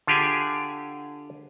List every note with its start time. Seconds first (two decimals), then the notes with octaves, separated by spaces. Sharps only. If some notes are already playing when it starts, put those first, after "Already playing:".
0.07 D3 F4 G4 G#4 G#5